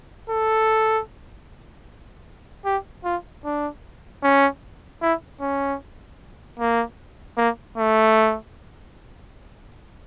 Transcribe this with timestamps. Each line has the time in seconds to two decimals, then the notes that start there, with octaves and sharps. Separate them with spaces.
0.30 A4
2.65 G4
3.04 F4
3.44 D4
4.23 C#4
5.02 E4
5.41 C#4
6.59 A#3
7.37 A#3
7.78 A3